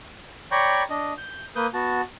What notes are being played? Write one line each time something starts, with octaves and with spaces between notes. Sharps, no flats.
C#5 D5 G5 A#5 B5 C#6
D4 D#5
G6
A#3 B4 D#6 G6
B3 F#4 A5